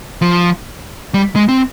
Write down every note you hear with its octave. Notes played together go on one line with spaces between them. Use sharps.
F3
G3
G#3
C4